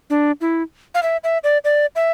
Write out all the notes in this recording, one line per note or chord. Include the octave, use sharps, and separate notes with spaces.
D4
E4
F5
E5
E5
D5
D5
E5